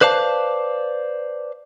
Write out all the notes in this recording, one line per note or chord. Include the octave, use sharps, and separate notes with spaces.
B4 C5 D5 F5 A5